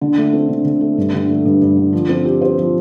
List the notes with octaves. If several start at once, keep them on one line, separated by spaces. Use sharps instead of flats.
D3
A3
C4
D3
D3
A3
G2
D3
A3
G2
G2
D3
F3
C4
G4
C5
F3